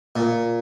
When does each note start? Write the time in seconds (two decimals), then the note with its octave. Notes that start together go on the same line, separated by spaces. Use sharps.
0.16 A#2